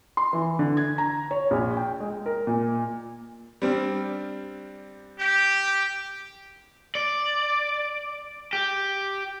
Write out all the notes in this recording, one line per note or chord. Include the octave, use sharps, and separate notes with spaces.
C6
E3
D3
G#6
A#5
C#5
A#1
G5
G#3
A#4
A#2
G3 C4 D4
G4
D5
G4